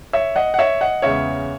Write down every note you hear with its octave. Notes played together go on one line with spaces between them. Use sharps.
C#5 E5
D#5 F#5
F#5
C#5 E5
D#5 F#5
E2 C#3 G#3 C#4 C#5 E5